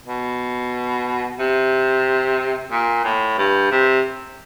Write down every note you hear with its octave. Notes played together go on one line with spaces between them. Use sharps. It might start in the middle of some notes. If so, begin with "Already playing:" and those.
B2
C3
A#2
A2
G2
C3